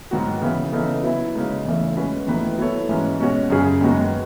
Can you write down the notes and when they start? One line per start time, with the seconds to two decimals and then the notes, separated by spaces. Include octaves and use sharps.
0.11 G#2 D#3 F#3 B3 F#4
0.41 C#3 E3 B3
0.72 C#3 E3 B3 D#4 A4
1.03 F#3 B3 E4
1.35 C#3 G#3 D#4
1.65 E2 C#3 E3 A3
1.96 G#3 C#4 F#4 B4
2.26 E2 D#3 A3 E4 B4
2.58 F#3 B3 E4 A4 C#5
2.89 G#2 E3 G#3 C#4
3.20 B2 G#3 C#4 F#4 C#5
3.50 F#2 C#3 F#3 C#4 G#4
3.81 F#2 D#3 G#3 B3 F#4